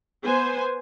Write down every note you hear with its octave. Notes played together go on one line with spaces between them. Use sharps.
B3 C5 G#5